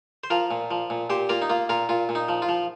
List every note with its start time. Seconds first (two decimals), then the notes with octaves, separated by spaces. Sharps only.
0.24 C5
0.30 F3 F4 A#4
0.51 A#2
0.71 F3
0.90 A#2
1.10 A#2 G4 C5
1.29 A#3 F4 A#4
1.42 D#4
1.50 A#3 F4
1.69 A#2 F4 A#4
1.89 A#2 F4
2.09 A#2
2.15 D#4
2.29 F3
2.42 F4
2.49 F3